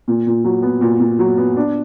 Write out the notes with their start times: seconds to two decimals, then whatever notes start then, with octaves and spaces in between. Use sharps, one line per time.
0.08 A#2
0.27 A#2
0.44 F#3
0.63 B3
0.81 A#2
1.00 A#2
1.19 F#3
1.38 B3
1.57 D4